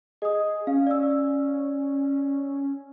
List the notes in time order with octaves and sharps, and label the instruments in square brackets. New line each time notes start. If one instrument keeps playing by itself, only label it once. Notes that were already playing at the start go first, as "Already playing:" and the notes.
[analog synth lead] G#4 [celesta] D#5 D#6
[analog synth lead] C#4 [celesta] F5
[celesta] D5 E6